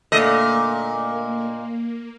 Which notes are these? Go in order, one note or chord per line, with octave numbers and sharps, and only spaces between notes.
A#2 D3 A3 A#3 D#5